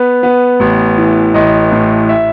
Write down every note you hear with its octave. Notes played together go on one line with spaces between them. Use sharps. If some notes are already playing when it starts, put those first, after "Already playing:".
Already playing: B3
B3
A1
E3
A1 D#5
A2
E5